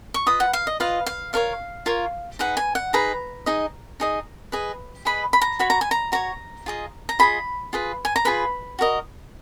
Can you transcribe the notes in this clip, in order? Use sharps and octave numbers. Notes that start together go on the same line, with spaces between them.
C#6
F4 B4 D#5 D#6
F#5
F5
D#5
F4 B4 D#5 F5
F5
F4 A#4 C#5 F5
F4 A#4 C#5
D#4 G#4 B4 F#5
G#5
F#5
D#4 G#4 B4 A#5
D#4 G#4 D#5
D#4 G#4 D#5
G#4 B4 D#5
G#4 B4 D#5 B5
B5
A#5
F#4 C#5 B5
A#5
G#5
A#5
F#4 C#5 A#5
F4 G#4 D#5
A#5
F4 G#4 D#5 B5
F4 G#4 B4
G#5
A#5
F4 G#4 B4 B5
F#4 A#4 D#5